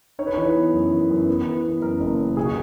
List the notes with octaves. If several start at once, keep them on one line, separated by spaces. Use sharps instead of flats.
D#4 C#5
B4
E3 C#5
B4
B3
F#2
E3
F#2
B3
E3
B3
F#2 A#4
F#1
F#2
B1 G#4
F#4